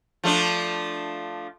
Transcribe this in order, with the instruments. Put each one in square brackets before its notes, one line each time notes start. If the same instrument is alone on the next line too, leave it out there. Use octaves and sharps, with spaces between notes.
[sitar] F3 A3 D4